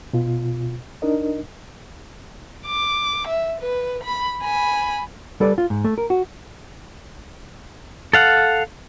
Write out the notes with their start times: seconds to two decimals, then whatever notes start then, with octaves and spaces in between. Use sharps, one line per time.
0.13 B2 F4
1.02 D4 D#4 A#4 D#5
2.67 D6
3.28 E5
3.61 B4
4.04 B5
4.42 G#5 B5
5.40 G3 A4 B4 D5
5.58 F4
5.70 G#2
5.85 A3
5.98 A#4
6.10 F#4
8.13 A4 F5 F#5